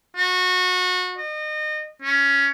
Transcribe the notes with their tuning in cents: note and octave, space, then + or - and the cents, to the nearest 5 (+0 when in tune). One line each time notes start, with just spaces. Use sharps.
F#4 -25
D#5 -30
C#4 +10